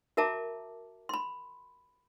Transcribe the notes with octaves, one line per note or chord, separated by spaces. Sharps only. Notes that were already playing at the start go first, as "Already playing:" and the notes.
F#4 A#4 E5 A5 A#5 D6
B5 C6